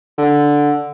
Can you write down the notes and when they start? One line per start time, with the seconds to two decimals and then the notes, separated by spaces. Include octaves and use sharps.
0.18 D3